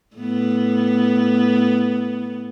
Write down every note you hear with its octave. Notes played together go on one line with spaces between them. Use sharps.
A2 B3